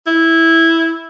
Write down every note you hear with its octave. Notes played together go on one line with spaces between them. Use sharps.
E4